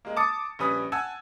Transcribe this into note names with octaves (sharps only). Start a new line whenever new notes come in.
G#3 A#3
A5 D6 D#6 A6 C#7
A#1 G3 C#4 B4 D#6
F#5 G#5 A5 E6 G#6